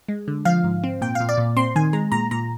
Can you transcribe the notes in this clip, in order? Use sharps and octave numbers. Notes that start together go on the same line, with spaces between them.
G#3
D3
F3 F5
G#2
C4
A#2 G5
F5
A#2
D5
A#2
C4 C6
D#3 G#5
G#3 A#5
A#2 A#5
A#2 A#5